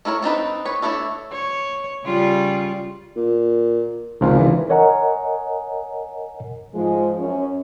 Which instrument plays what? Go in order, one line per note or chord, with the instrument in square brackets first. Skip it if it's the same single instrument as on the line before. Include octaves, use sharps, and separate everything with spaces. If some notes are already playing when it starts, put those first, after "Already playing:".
[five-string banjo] A3 E4 A#4 C#5
C4 D4 D#4 B4
B4 C#5
A3 D4 E4 C#5 E5
[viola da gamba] C#5
C#3 G3 F4
[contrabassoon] A#2
[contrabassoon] G#1 [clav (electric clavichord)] C#2 F3 F4
[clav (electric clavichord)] E3
[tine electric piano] A#4 C#5 D#5 F#5 G#5 A#5
[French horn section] G#2 F3 G#3
F#2 C#4 C#5